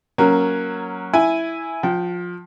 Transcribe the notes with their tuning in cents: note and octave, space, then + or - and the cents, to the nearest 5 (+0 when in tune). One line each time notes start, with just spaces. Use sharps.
F#3 +0 A#3 +0 C#4 +0
E4 +0 G#5 +0
F3 +20 G5 -25